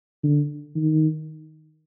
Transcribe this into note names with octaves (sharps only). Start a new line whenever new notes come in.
D3
D#3